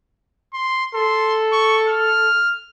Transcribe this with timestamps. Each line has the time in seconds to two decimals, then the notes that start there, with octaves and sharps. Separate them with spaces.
0.53 C6
0.95 A4 C6
1.52 C#6
1.88 F6